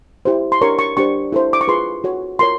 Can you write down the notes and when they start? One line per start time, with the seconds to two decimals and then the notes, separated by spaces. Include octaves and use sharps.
0.25 E4 G4 C5
0.52 C6
0.61 D4 G4 A#4 C#5 C#6
0.79 C#6
0.97 D4 G4 C5 C#6
1.32 E4 A4 C5
1.53 D6
1.61 C#6
1.68 F4 G#4 B4 C6
2.04 F#4 A4 C#5
2.39 F4 A#4 C#5 C6